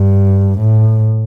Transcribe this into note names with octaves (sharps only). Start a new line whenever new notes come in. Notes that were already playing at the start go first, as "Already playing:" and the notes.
Already playing: G2
A2